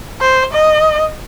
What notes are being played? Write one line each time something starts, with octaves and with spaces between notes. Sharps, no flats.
C5
D#5